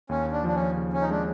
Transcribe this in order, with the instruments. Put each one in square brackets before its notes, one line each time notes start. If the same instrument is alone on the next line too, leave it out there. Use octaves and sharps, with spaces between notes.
[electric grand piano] D#2 [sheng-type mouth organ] C#4
[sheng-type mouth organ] D4
[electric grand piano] F3 [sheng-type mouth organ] D4
[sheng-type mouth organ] C#4
[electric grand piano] C#3
[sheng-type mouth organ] C#4
D#4
[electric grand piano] G#3 [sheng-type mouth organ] D4